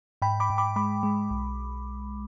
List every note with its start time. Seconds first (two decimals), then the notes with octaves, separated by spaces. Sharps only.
0.22 G#2 G5 B5
0.40 B5 D6
0.50 G#2
0.58 B5 D6
0.76 G#3 B5 D6
1.03 G#3
1.30 B1